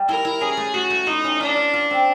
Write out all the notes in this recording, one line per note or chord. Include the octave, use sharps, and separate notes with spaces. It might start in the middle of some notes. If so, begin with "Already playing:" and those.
Already playing: G3
E4 A#4
E4
C#4 G#4
A3
A3 F#4
A3
D#4 E4
C#4
D4 F4
F4
F4
C4